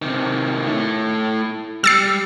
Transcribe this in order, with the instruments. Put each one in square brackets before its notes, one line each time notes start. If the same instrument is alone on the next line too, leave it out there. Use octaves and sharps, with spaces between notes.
[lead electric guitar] C3 D#3
A3 E4
[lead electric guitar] G3 [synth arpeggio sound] E6 A6 C7